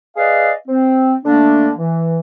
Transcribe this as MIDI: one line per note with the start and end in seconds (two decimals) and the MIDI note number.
0.17 0.51 68
0.17 0.51 71
0.17 0.51 74
0.17 0.51 75
0.17 0.51 77
0.67 1.14 60
1.24 1.70 50
1.24 1.70 57
1.24 1.70 58
1.24 1.70 62
1.77 2.20 52